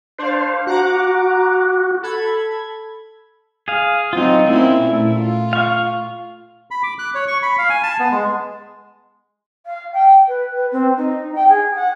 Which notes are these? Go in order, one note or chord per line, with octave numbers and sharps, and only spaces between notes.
D4 C5 D5 F5
F#4 F#5 A#5 D6
A4 B5 G#6
G#4 F5
F#3 C4 D#4 F4
A#3 C4 C#4 E4
A#2 A3
F4
F5 C#6
B5
D6
F#6
C#5
C#6
B5
F5
G#5
A5
B3
G#3
F5
G5
B4
B4
C4
D#4
G5
G#4
F#5